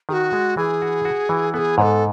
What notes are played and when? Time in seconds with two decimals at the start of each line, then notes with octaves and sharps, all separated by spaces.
0.09 D#3 G#4
0.13 F#4
0.33 G#3
0.57 E3 G#4
0.82 F#4
1.05 F#4
1.29 E3
1.54 B3 G#4 A4
1.78 G#2 C#5
1.82 A4